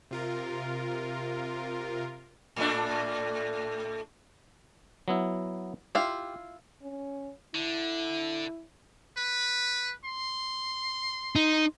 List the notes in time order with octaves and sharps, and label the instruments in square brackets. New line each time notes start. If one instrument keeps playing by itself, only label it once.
[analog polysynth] C3 F4 A#4
[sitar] A2 A3 D4
[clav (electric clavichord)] F#3 B3 E4
[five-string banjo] E4 F4 [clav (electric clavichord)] G4
[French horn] C#4
[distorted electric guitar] D3 [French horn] E4
[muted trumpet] B4
C6
[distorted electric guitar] D#4